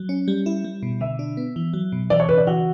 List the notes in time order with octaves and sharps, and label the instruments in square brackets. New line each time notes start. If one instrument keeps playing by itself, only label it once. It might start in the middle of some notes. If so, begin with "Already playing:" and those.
Already playing: [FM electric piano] F#3
C#4
G3
E4
G3
B2
[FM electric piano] D3 [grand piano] E5
[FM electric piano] D4
B3
E3
F#3
B2
[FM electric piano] E3 [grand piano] D5
[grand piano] C#5
[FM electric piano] C#3 [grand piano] B4
[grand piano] D5
[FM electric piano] E3 [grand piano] F#4